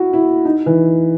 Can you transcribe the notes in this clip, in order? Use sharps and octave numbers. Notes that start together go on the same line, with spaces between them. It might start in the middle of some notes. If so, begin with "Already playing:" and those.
Already playing: E4 F#4
E4
D#4
E3